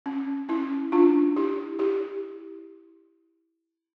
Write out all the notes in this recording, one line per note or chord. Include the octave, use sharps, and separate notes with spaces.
C#4
C#4 E4
D4 F4
E4 G4
E4 G4